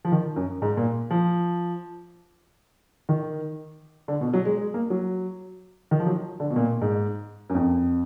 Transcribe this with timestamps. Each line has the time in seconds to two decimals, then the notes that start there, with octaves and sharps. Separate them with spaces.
0.05 F3
0.12 D#3
0.36 F#2
0.62 G#2
0.77 A#2
1.11 F3
3.09 D#3
4.08 D3
4.21 B2
4.33 F#3
4.45 G#3
4.58 G#3
4.74 A#3
4.90 F#3
5.91 D#3
6.00 F3
6.07 F#3
6.40 D3
6.50 B2
6.56 A#2
6.81 G#2
7.49 F#2
7.55 F2